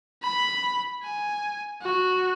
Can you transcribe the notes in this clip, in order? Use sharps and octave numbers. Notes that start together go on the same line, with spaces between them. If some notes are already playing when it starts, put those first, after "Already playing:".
B5
G#5
F#4